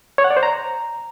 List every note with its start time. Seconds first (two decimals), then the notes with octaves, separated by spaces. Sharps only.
0.18 C#5
0.24 F#5
0.30 D5
0.37 C5
0.43 A#5